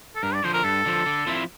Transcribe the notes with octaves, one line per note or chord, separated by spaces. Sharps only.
A4
G2 A#4
D5
D3 F3 C5
A#4
G2 A4
D3 F3
D3
F3 C4 E4